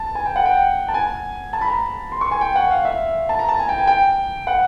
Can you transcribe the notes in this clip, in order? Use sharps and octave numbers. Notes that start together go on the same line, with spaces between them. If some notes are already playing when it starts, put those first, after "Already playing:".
Already playing: A5
G#5
G5
F#5
G5
A5
G#5
A5
B5
A#5
C6
C#6
G#5
G5
F#5
F5
E5
A5
A#5
A5
G#5
G5
G#5
G5
F#5